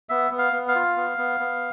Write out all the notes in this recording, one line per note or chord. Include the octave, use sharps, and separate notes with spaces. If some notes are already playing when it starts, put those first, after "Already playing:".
B3 E5
B3
F5
B3
F5
F4
B3
B3
B3